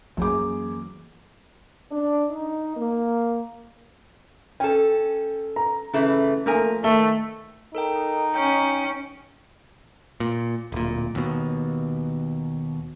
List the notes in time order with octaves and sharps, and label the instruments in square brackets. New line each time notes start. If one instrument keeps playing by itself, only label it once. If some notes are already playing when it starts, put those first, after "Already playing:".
[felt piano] F#2 G#4 D6 [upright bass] E3 A#3
[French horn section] D4
D#4
A#3
[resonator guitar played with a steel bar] C#4 A4 [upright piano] G5
[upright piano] A#5
[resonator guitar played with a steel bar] F#2 E3 A3 [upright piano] C#3
[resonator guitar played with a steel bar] F3 A#4 G#5 [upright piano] A3 A#3
[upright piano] D#3 E5 G7 [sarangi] A3
[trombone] D#4 [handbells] A4 A#4 G5
[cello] C#4 [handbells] G5 G6
[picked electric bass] A#2
D1 A#2
D#2 B2